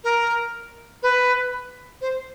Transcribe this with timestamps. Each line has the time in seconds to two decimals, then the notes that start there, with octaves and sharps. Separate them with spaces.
0.04 A#4
1.02 B4
2.01 C5